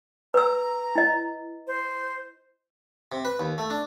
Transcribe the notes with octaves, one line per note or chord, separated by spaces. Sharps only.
B4 A#5 E6
E4 D#5
C5
C3
B4
D#2
A3
D4